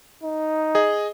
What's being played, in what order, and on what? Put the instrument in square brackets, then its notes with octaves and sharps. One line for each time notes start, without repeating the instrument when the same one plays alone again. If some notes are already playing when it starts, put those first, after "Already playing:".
[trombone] D#4
[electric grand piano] G#4 D#5